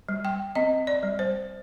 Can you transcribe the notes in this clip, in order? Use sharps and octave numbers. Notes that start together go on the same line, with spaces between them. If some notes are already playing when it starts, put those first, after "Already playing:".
G3
G5
C4 D#5
D5
G3
C5